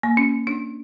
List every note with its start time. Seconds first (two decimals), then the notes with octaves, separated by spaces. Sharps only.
0.03 A#3
0.17 C#4
0.47 D4